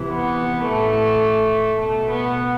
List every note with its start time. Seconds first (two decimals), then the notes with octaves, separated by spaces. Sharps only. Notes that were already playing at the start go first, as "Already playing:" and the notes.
Already playing: C3 E3
0.11 B3
0.68 A2 E3 A3
1.81 B2 A3
2.11 B3